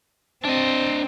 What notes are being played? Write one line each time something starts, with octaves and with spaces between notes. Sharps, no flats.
C4 D4 D#5